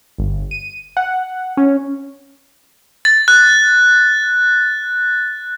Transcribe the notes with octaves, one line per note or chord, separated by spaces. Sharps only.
G1
D#7
F#5
C#4
A6
F#6